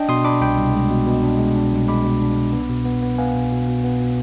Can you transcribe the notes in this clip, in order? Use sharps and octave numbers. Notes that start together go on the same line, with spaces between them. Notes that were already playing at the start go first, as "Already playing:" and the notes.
Already playing: D4 D#5 G5
B2 C6 D#6
D4 B5 D6
C2 G5 B5
C2
G#3
B2
B2
D4
G#3
D4
C2
G#3 B5 D6
B2
D4
C2
B3
B2
B3
B3
B3 F5 G#5
B2
B2
B2
B3
B2